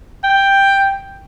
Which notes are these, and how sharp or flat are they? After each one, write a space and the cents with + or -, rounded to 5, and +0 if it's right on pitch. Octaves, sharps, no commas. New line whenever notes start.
G5 +5